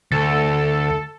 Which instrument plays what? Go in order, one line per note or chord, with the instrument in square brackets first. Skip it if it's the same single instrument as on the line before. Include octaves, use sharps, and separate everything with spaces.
[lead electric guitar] D2 [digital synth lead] A4